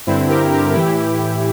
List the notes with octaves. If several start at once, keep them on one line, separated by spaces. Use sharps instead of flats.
G2 D3 C4 E4
G4 A#4
G4 A#4
A2 E3 E4 G4